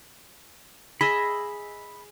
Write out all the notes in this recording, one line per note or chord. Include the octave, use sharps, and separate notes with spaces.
G#4 D#5 E5 B5